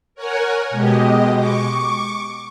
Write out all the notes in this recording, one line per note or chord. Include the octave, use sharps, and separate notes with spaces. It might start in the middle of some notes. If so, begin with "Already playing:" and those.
A#4 C#5 F#5 G#5
B2 G#3 G4 D#5
C#6 D6